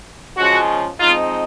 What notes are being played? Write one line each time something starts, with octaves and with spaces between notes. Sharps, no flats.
C#3 F3 G#3 C#4 F#4
F3 G#3 C4 D#4 F4